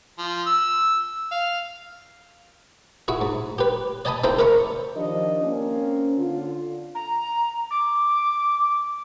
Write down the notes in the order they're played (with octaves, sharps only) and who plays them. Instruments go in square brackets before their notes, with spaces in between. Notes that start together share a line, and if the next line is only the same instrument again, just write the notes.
[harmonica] F3
E6
F5
[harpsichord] E4 F#4 G#4
G#2
G4 B4
D5 D#5 G#5 A5 B5 D#6
C4 E4 G#4 A4 C5 A#5
A#4 D5 E5 B5 C#6
[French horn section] D#3 F3 D4 G4 D#5
A#3 C4 C#4
D3 F4
[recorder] A#5
D6